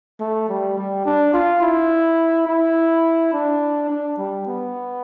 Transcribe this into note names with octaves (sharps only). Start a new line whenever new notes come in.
A3
G3
G3
D4
F4
E4
E4
D4
D4
G3
B3